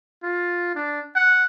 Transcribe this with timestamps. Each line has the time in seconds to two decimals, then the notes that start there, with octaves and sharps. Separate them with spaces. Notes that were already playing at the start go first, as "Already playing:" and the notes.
0.23 F4
0.76 D4
1.16 F#5